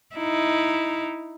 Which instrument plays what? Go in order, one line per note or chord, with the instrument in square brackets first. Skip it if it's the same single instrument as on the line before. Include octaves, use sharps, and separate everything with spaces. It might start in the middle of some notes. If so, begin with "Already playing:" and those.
[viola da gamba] D#4 E4